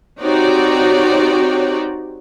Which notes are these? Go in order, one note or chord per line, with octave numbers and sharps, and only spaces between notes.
C4 D#4 F#4 G4 C#5 D5